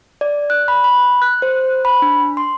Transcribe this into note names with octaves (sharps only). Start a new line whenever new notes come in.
D5
F#6
B5
B5
F#6
C5
B5
D4
C6